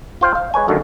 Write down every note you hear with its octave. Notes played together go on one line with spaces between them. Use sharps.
F4 C5 F5 G5
F5
G#3 B4 C#5 G#5
F#2 D3 D#3 A3